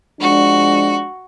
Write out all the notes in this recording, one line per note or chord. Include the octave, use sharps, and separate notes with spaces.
F3 G#3 D4 F#4